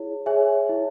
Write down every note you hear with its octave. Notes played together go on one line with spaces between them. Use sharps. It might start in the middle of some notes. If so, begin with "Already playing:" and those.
Already playing: E4 G#4 C#5
G#4 C#5 E5 G#5
E4